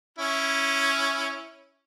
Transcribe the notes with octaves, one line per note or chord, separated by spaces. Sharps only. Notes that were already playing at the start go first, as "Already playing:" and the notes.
C#4 E4